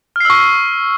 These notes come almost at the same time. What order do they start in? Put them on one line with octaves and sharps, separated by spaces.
F6 C7 E6 C#6